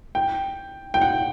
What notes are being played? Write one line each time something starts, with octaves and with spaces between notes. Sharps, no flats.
G5
G5
F#5